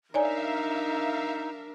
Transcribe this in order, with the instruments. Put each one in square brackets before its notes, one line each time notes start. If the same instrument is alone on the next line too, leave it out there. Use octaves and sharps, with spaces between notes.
[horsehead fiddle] D4 A#4 [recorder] D#4 [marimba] C#5 D5 G#5 [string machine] E5 F5